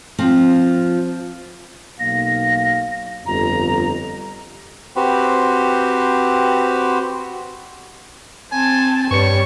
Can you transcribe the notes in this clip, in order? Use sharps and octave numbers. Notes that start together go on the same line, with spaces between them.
F3 C4
B1 A#3 F5 A#6
G1 F2 A#5
C4 F#4 G4 B4 C5
C4 G#5 A5
G2 G3 B4 C#5 C#6 C#7